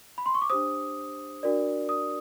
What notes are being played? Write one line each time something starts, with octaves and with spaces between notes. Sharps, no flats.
B5
C6
C#6
D6
D4 G4 C5 D#6
D4 F#4 A#4 D5
D#6